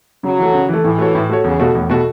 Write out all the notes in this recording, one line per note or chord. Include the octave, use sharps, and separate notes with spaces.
C#3 F#3
E3 A3
C#3
E3
A3
A2 E3
A3 F#4 C#5
A2
A3 F#4 C#5
E2 C#3
B2 A3 F#4
E2 A2
B2 A3 F#4